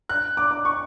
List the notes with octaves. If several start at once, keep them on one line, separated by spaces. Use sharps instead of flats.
F#6
D6
D6
C#6